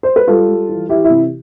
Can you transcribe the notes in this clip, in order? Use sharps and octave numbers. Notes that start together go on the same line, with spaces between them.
C5
B4
G3 F4 A4
G3
E3
E3 E4 G4
E4
C3